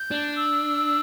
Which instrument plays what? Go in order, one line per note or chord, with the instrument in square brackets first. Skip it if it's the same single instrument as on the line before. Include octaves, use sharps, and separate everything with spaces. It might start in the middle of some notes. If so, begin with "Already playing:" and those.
Already playing: [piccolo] G6
[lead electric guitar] D4
[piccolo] E6